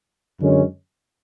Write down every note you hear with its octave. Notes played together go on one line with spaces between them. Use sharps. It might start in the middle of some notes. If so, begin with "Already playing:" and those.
F#2 D3 G#3 C#4